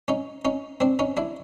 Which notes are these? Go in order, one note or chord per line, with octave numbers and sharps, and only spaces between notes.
C#4 D#4
C#4 D#4
C4 D4
C#4 D#4
D4 E4